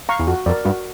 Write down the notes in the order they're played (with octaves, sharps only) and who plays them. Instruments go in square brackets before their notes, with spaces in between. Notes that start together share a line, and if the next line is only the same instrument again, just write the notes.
[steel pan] F5 A#5 C#6
[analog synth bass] E2
[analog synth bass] F2 [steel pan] F#4
[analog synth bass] F2 [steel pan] D5
[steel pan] A#4
[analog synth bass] G2 [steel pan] F#4